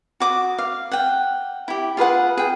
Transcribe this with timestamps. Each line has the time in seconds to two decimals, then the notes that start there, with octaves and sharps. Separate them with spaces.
0.20 F#4 D6 D#6
0.59 F5
0.92 F#5 G5
1.68 E4 G4
1.97 F4 G#4 B4 F#5
2.37 G#4 G5